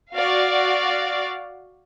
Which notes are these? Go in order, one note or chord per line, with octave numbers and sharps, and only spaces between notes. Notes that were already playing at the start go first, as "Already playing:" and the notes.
F#4 D5 F5